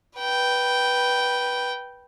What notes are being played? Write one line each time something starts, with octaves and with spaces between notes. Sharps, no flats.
B4 G5